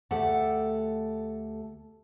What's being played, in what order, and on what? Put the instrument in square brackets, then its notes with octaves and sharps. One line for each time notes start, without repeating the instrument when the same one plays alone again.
[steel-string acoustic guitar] D2 A3 G4 A4 F#5